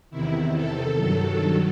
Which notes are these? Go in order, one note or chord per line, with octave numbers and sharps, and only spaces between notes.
E2 C3 D#3 E4
A4
G2 D#3 F#3